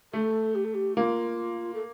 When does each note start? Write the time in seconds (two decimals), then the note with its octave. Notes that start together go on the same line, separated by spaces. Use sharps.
0.13 A3 A4
0.55 G4
0.64 A4
0.74 G4
0.96 A#3 F4
1.74 A4